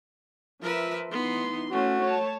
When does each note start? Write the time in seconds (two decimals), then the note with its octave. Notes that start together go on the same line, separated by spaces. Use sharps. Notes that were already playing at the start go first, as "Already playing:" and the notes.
0.62 F3 A#4 B4 E5
1.11 E3 B3 D#4 C6
1.71 A3 C#4 F#4
2.02 C#5 A5